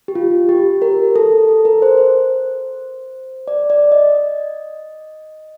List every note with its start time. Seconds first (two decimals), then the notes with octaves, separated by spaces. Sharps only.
0.08 G4
0.15 F4
0.49 G4
0.82 A#4
1.16 A4
1.48 A4
1.65 A#4
1.82 C5
1.98 C5
3.48 D5
3.70 D5
3.92 D#5